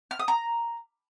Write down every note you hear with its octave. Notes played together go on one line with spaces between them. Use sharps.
F6
D#6
A#5